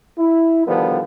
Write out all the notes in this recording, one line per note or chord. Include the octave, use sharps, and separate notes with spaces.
E4
B2 D3 D#3 F3 G3 B3